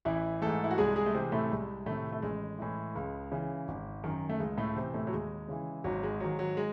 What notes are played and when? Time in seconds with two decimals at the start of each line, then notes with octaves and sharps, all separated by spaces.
0.05 A1 E3 E4
0.42 G#2 E3 A3 A4
0.64 E4
0.71 F#4
0.78 C2 G#3 G#4
0.96 G#3 G#4
1.06 A3
1.14 C3 E3 C4
1.32 A2 A3
1.50 C2 G#3
1.86 A2 C3 D#3 A3
2.12 A3
2.22 A1 G#3
2.59 A2 E3
2.95 C#2
3.32 C#3 E3
3.68 G#1
4.04 F#2 D#3
4.30 A3
4.39 C#2 G#3
4.57 A2 A3
4.76 C3 E3 C4
4.94 A2 A3
5.07 F#3
5.12 D#2 G#3
5.48 C#3 E3
5.84 G#1 F#3
6.03 G#3
6.20 G#2 D#3 F#3
6.39 F#3
6.57 G#3